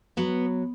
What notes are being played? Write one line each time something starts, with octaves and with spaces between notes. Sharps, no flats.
F#3 B3